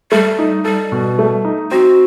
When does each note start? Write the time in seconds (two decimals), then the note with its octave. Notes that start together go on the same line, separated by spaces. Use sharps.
0.12 G3 A3
0.39 D#4
0.64 G3 A4
0.92 B2
1.19 A3
1.45 D#4
1.71 C4 F#4